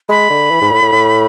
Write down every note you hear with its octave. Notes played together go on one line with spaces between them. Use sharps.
G#3 B5
D3
E3
G#2
A2
A2
A2